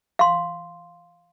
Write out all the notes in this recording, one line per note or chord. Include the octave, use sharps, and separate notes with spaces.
F5 C6